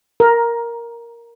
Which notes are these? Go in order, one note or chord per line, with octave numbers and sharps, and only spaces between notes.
A#4